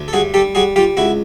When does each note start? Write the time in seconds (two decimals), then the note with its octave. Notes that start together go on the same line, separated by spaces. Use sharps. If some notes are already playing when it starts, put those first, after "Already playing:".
Already playing: D2
0.08 A4
0.13 G2 F#4 G#4
0.34 G3 G4 A4
0.55 G3 F#4 G#4
0.76 G3 F4 G4
0.97 C#2 E4 F#4